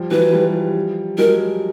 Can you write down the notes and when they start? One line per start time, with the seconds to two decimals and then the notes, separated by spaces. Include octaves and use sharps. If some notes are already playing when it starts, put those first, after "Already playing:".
Already playing: F3 G3
0.11 E3 F#3 B4
0.33 F3 G3
1.18 F#3 G#3 A#4